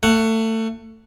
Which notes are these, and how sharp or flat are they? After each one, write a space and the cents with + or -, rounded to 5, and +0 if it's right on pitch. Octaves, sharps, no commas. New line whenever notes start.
A3 +25 F#5 +0